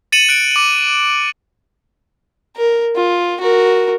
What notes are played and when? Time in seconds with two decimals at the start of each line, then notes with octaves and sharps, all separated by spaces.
0.12 A6 C#7 D#7 E7 F#7
0.29 F#6 D7
0.51 D6 F#7
2.56 A#4
2.96 F4
3.40 F#4 A#4